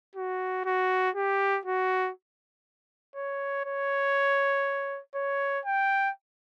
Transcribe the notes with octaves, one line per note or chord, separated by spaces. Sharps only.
F#4
F#4
G4
F#4
C#5
C#5
C#5
G5